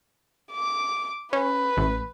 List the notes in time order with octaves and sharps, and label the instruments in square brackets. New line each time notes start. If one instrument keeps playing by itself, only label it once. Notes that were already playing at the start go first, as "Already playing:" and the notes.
[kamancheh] D6
[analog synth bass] C#4 [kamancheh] B4
[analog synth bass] A1